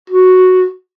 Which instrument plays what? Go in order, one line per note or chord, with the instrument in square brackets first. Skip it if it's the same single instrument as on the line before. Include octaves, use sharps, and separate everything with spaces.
[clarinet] F#4